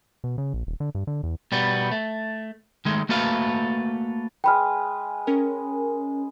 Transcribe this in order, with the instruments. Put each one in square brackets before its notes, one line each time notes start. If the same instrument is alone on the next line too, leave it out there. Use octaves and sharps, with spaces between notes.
[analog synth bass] B2
C#3
A#1
D#1
D3
G2
D3
E2
[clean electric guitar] B2 G3 B3
A3
D#3 G#3 A3
A3 A#3 F#4 A4 B4 F5
[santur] G#3 B4 [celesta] G5 B5 F6
[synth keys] C#4 A#4